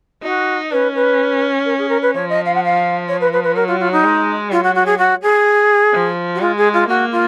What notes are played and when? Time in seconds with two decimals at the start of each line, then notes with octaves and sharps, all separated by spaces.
0.23 D#4 F#4
0.71 C#4 B4
0.95 B4
1.65 A#4
1.78 G#4
1.89 A#4
2.02 B4
2.14 F3 C#5
2.29 D#5
2.45 F5
2.55 F#5
2.64 F5
3.08 C#5
3.20 B4
3.33 B4
3.43 B4
3.55 F#3 A#4
3.67 F4
3.80 F4
3.92 D#4
4.04 G#3
4.50 F#3 F4
4.63 F#4
4.75 F#4
4.86 G#4
4.98 F#4
5.22 G#4
5.93 F3
6.35 F#4
6.40 G#3 F4
6.57 G#4
6.73 F4
6.88 A#3 F#4
7.12 F4